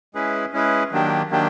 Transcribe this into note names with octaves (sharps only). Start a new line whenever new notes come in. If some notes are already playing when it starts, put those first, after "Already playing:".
G#3 C#4 E4 G#4 B4
G#3 C#4 E4 G#4 B4
D#3 F#3 A#3 D4 G4
D#3 F#3 A#3 D4 G4